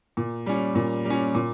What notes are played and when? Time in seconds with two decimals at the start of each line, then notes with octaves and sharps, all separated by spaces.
0.17 A#2
0.46 G3 C#4
0.75 A#2
1.05 G3
1.10 C#4
1.35 A#2